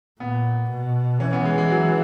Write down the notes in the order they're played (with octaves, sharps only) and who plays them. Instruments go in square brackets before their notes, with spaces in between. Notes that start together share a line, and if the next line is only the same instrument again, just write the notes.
[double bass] A#2 [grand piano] B3
[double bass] B2
[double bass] E3 [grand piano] C#4
[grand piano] B3
G#3
G#3
F#3